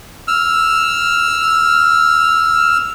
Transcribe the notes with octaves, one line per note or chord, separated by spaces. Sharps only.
E6 F6